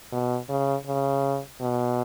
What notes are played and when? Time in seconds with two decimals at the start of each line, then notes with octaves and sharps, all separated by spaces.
0.12 B2
0.49 C#3
0.87 C#3
1.61 B2